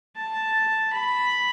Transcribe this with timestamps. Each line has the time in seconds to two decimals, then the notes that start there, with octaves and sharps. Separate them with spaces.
0.17 A5
0.93 B5